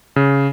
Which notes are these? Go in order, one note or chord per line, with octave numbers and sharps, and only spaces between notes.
C#3